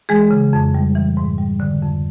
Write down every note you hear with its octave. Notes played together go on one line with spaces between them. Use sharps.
E3 G#3 G#4
C#3
F2
G3
E3
G#2
G3
D3
F2